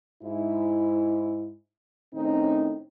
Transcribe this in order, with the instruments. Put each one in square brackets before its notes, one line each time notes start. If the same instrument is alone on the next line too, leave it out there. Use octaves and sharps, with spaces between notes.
[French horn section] G#2 E4
A2 D#3 C4 C#4 D#4